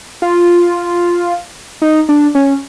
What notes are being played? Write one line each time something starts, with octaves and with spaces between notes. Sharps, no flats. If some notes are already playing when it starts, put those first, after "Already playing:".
F4
D#4
D4
C#4